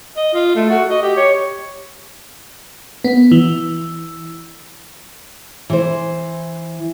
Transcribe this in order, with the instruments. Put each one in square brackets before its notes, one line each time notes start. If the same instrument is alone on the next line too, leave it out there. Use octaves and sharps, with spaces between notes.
[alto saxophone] D#5
F4
A3
F#4
D#5
G4
C#5
[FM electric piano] B3
E3
[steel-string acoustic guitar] E3 C5